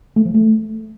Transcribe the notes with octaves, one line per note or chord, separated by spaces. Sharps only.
A3
F3
A3